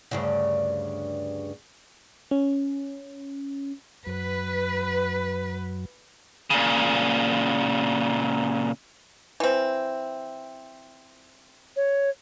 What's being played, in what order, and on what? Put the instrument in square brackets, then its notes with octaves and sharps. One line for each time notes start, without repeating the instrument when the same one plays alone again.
[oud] D2 G2 C#3
[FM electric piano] C#4
[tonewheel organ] F#2 F#3 [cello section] B4
[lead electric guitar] A#2 C#3
[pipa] E3 C4
[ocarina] C#5